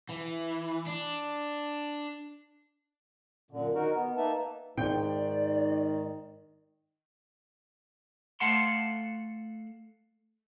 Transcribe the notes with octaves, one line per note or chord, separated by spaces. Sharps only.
E3
D4
F#2 A#2 D3
D#3 D#4 F#4 A#4
B3
A#3 D#4 B4 E5 A5
G#2 D#3 D5 G5
A3 A4 F5 F#5 A5 C6